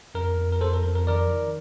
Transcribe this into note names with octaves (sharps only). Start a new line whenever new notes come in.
F2 A#4
F2
A#4
F2 A4 C5
A#4
F2
A#4
D#3 A#4 D5
D#3